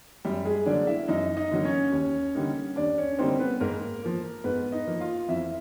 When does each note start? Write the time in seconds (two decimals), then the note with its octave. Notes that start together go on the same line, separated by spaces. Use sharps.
0.25 F#2 G3 G4
0.45 G#3 G#4
0.66 D3 F#3 A#3 D4 D5
0.87 E4 E5
1.08 F#2 D#4 D#5
1.37 D#4 D#5
1.51 D3 F#3 A#3
1.65 C#4 C#5
1.92 D#2
2.35 D3 G3 A#3 D#4
2.76 D#2 D4 D5
2.98 C#4 C#5
3.18 D3 G3 A#3 C4 D#4 C5
3.39 B3 B4
3.61 G#2 A#3 A#4
4.02 F3 A#3
4.44 G#2 B3 B4
4.72 D#4 D#5
4.87 F3 A#3
5.00 F4 F5
5.29 F2 E4 E5